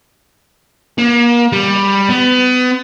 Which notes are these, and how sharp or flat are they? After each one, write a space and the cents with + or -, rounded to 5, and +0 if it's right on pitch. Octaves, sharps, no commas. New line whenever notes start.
A#3 +35
G3 +10
B3 +30